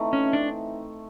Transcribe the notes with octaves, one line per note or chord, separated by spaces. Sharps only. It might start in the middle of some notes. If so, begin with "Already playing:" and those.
Already playing: E3 A3 C4 D#4
C#4
D4